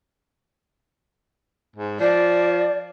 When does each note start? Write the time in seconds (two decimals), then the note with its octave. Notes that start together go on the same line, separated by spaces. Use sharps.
1.76 G#2
2.00 F3 D5